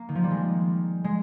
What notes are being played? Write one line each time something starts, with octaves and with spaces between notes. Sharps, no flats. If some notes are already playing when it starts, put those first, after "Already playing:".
Already playing: A#3
D#3
F3
G3
G#3
G#3